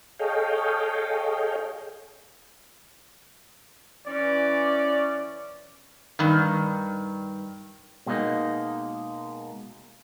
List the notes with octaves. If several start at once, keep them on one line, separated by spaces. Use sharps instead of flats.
G#4 A4 C#5 D#5 F5 G5
E3 C#4 D5
G2 D#3
B2 G#3 A#3 C#4 D#4